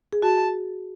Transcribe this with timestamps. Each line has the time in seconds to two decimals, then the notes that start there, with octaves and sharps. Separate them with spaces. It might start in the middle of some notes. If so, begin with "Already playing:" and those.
0.13 G#4
0.22 F#4 A5